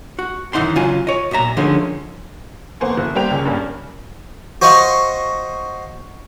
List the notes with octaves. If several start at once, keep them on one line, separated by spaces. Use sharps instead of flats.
F#4
F#2 D#3 E3 D#4 F#5 C6
C#3 F#3 F4 G#5
C#5 D#5
B1 A#2 E5 A#5
D3 D#3 F3 G#3 A3 C#4
F1 A#3 B3 C5 G#5 C#6
F#1
G3 A#3 C5 G5 F7
C#2 C#3 C#4
G2 G3 A#3 C#4
F#4 C5 D#5 F5 C#6